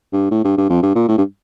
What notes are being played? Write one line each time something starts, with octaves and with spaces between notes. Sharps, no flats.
G2
A2
G2
G2
F2
G2
A#2
A2
G2